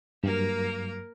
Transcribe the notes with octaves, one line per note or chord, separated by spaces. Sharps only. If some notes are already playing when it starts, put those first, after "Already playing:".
G2 F#3 A#3 A#4